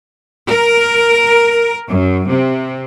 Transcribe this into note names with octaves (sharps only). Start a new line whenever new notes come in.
A#4
F#2
C3